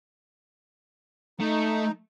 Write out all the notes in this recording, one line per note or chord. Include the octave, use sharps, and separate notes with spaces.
A3 D#4